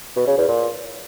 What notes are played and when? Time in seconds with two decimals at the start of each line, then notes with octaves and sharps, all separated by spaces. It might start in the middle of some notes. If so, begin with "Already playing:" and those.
0.16 B2
0.27 C#3
0.38 E2
0.48 A#2